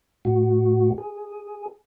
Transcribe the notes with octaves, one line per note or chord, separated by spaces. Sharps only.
A2 F#4
G#4